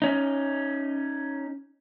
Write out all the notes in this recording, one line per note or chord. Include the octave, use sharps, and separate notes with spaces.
C#4 D#4